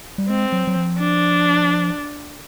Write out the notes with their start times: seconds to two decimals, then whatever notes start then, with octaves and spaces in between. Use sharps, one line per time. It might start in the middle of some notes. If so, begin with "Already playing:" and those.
0.18 G3
0.29 G#3 C4
0.53 F#3
0.67 F#3
0.76 F3
0.99 D4